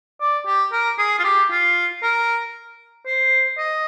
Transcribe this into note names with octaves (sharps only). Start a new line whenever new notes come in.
D5
G4
A#4
G#4
F4
G4
F4
A#4
C5
D#5